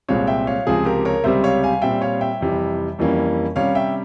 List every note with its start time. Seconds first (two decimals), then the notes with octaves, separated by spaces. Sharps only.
0.09 C2 A#2 G#3 C4 C#5 F5
0.27 E5 G5
0.47 C#5 F5
0.67 C#2 C3 F3 C4 G#4
0.85 G4 A#4
1.05 A#4 C#5
1.24 C#2 C3 G3 C4 C5 E5
1.44 C#5 F5
1.63 F5 G#5
1.82 A#2 G3 C4 E5 G5
2.02 C#5 F5
2.21 E5 G5
2.41 F2 C3 E3 G3
2.99 F2 E3 G3 A#3 C#4
3.56 C3 G3 C#4 C#5 F5
3.75 E5 G5